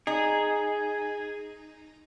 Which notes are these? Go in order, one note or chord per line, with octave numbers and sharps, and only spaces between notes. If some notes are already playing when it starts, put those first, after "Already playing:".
D#4 G#4